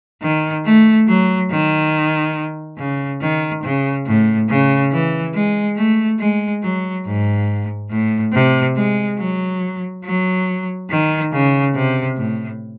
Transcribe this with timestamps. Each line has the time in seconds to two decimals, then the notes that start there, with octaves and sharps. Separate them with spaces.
0.22 D#3
0.65 A3
1.08 F#3
1.51 D#3
2.78 C#3
3.21 D#3
3.63 C#3
4.06 A2
4.49 C#3
4.92 E3
5.34 G#3
5.77 A3
6.19 G#3
6.63 F#3
7.05 G#2
7.90 A2
8.33 C3
8.76 G#3
9.19 F#3
10.04 F#3
10.90 D#3
11.32 C#3
11.75 C3
12.17 A2